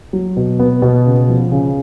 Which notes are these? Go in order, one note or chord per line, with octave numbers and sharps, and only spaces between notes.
F#3
B2
B3
B2
C#3
F3
C#3